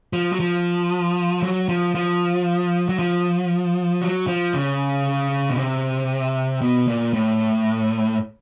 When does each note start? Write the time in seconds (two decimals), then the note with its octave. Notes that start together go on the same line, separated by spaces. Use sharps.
0.13 F3
0.32 F#3
0.40 F3
1.43 F#3
1.69 F3
1.95 F3
2.89 F#3
2.99 F3
4.02 F#3
4.27 F3
4.54 C#3
5.50 B2
5.58 C3
6.61 B2
6.88 A#2
7.13 A2